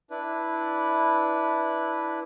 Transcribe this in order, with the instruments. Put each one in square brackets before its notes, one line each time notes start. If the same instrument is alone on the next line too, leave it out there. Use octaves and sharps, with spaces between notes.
[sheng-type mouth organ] D4 E4 B4